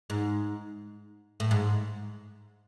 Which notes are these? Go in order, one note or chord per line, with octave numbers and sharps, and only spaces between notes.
G#2
A2
G#2